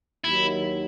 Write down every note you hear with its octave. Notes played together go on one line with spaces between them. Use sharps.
D#2 D#3 F#3 E4